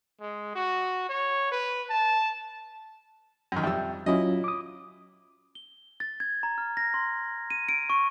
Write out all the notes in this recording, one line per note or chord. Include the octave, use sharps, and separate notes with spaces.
G#3
F#4
C#5
B4
A5
F#2 D#3
F2 G3 E5 G5 E6
F#3 C#4 E4 F4 D#5
D6 D#6
G7
A6
G#6
A#5
F6
A#6
C6
D#7
D7
C#6